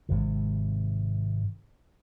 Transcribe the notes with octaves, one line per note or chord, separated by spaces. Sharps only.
G#1 C3